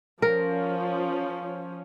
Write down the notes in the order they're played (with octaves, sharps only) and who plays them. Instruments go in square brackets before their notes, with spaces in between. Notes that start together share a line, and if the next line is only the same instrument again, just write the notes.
[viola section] F3 C#4 [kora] A#4